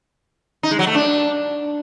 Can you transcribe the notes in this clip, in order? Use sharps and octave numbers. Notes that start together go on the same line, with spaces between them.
D#4
G#3
F#3
A3
D4